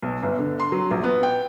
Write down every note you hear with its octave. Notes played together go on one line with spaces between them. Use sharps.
B1
G1
D3
C6
F#3
A#1
B3
G5